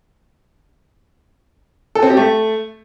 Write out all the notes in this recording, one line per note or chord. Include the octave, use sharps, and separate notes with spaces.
A4
C4
G4
A3